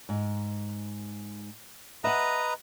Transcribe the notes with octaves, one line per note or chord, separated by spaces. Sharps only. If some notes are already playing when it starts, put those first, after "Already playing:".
G#2
B4 D#5 E5 F#5 A#5